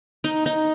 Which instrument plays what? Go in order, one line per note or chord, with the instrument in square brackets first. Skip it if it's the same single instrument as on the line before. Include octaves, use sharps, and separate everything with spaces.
[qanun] D#4
D#4